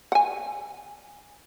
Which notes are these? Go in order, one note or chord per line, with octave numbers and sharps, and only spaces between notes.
F#5 G#5